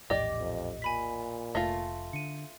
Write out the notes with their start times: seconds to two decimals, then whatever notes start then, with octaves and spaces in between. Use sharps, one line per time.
0.10 A#1 E2 A2 G4 D5 D#5
0.39 F2
0.82 A#2 G#5 B5 B6
1.55 F1 A3 F4 A#6
2.13 D3 C#7 D#7